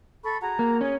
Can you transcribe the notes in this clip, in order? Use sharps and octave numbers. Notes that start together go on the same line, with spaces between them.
A4 B5 C#6
F#4 G#4 A#5
A#3
C#4 G#4 C#5 G#5